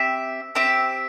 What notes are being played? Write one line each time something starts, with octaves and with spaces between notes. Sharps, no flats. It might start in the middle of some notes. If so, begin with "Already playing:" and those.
Already playing: C4 G4 E5
C4 G4 E5